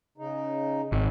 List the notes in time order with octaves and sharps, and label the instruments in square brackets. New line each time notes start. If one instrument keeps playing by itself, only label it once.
[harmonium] C#3 D#4
[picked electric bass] G#1